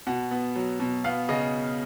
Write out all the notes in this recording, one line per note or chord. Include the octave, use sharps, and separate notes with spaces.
B2 F#5
B3
F#3
B2
B3 F5
C#3 D#5